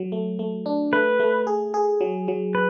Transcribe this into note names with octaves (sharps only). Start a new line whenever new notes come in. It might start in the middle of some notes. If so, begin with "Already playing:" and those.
Already playing: F#3
A3
A3
D4
A3 B4
A3
G#4
G#4
F#3
F#3
B4